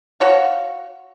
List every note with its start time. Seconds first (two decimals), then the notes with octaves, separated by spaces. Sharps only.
0.20 F#4 C#5 F5